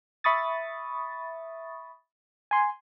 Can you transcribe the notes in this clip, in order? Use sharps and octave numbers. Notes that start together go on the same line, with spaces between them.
E5 B5 C#6 D#6 A6
G#5 C6